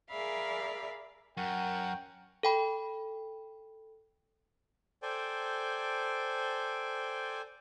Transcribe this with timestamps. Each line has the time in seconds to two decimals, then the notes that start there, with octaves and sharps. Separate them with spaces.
0.10 G#4 A#4 D5 E5 F5 B5
1.37 F#2 A#4 F#5 G5 C#6
2.43 A4 G5 B5
5.02 A4 C5 D5 G5 G#5